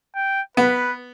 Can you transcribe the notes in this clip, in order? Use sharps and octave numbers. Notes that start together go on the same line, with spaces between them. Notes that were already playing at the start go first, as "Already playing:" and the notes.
G5
B3 B4